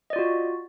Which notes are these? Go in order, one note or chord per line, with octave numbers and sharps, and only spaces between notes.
F4 F#4 D5 D#5